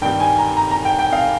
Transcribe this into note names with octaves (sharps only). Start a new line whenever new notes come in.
G2 D#3 G3 G5
G#5
A#5
A#5
A#5
G5
G5
F5